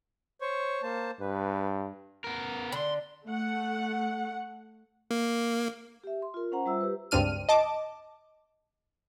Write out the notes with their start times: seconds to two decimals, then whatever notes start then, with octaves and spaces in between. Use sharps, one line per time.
0.41 C5 C#5 C#6
0.83 A#3 C5 A5
1.20 G2 B4
2.24 B3 A#4
2.72 D3 B5 C6
3.26 A3 F#5
5.11 A#3
6.04 G4 E5
6.22 C6
6.34 F4 A#4
6.52 C#4 C5 F#5 A#5
6.66 G3 F4 C5 E5 E6
6.81 G4 B4
7.11 C#2 G2 C4 D4 F6 D#7
7.49 D#5 A5 D6